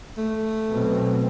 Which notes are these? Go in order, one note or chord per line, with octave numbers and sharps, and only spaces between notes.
A3
B2 F#3 C4